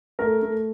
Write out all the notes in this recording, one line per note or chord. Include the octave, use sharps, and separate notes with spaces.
A3 A#4
A3